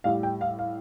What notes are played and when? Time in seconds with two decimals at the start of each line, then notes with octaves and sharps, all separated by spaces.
0.04 A2 G3 F5
0.23 G5
0.41 F5
0.59 F5